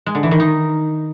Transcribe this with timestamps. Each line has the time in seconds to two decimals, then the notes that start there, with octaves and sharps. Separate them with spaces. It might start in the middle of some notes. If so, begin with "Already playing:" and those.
0.06 G#3
0.15 D3
0.23 E3
0.31 D#3
0.40 D#4